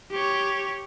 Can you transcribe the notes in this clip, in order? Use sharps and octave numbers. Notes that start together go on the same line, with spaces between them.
G4 C#5